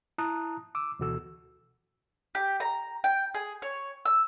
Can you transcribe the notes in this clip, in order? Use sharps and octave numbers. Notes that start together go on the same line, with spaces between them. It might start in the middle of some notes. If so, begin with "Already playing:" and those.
E4 A5 A#5 D#6 F#6
D6 E6
D2 B2 E3 F#4 A4 E6
G4
A#5
G5
G#4
C#5
E6